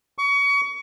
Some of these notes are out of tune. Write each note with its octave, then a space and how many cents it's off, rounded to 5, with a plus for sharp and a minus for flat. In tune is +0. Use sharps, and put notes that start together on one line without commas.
C#6 +30